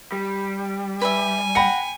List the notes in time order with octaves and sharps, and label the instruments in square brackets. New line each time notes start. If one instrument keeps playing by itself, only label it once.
[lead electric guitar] G3
[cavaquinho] B4 D5 E5 [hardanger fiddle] G#5
[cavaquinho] F#5 A#5 [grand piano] G5 B5 C#7